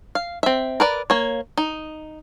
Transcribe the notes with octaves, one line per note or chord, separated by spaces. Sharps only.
F5
C4 E5
A#4 B4 D5
A#3 C#5
D#4